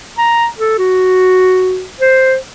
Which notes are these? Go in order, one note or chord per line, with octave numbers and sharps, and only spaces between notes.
A#5
A4
F#4
C5